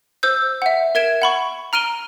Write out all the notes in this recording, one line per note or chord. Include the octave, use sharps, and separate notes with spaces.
C5 E6 G6
E5 F#5
A#4 E5 G#6 D7 E7
F#5 B5 C#6
A#5 F6 D7 D#7 G7